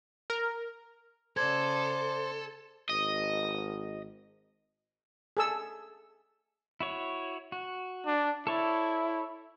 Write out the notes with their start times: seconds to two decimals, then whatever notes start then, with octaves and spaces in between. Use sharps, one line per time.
0.30 A#4
1.37 C#3 A4 C5 D5 G#6
2.89 G#1 D#5
5.37 G#4 A4 E6
6.80 E4 F#4 C#5
7.52 F#4
8.06 D4
8.47 E4 A4 C#5 D5